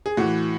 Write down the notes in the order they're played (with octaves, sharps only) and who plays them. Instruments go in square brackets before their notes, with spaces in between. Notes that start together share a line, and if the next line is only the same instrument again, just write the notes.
[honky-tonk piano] G#4
A2 E3 F#4